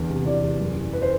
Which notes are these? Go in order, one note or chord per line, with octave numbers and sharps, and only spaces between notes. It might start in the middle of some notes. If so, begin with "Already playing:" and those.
Already playing: E2 D3
C3
E3 D5
E2
F#2
E3
B4
C5